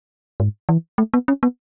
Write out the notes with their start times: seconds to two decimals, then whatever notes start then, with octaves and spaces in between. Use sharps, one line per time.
0.40 G#2
0.69 E3
0.98 A3
1.14 B3
1.28 C#4
1.43 B3